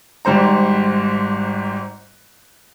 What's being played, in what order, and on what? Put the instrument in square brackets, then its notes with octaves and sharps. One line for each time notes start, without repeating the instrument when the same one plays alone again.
[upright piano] G#1 G#2 G3 C5 A#5